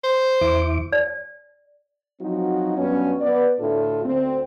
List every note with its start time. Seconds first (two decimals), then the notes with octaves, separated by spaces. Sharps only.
0.04 C5
0.41 E2 E4 D6
0.92 D5
2.21 F3 F#3 C4 D#4 F#4
2.78 G2 F#3 B3 C#4
3.21 B3 B4 D5
3.60 D2 A2 D4 F4 A4
4.05 D2 C4